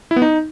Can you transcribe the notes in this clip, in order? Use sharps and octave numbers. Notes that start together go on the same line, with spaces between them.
E4
B3
D#4